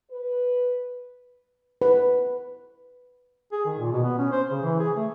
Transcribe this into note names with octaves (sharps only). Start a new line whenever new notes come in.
B4
B4
G#4
D#3
A#2
B2
B3
C#4
C5
C#3
E3
G#4
A3